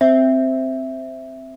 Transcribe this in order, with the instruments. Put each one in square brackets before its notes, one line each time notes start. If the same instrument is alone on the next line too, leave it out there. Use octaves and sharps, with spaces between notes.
[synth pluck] C4 [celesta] E5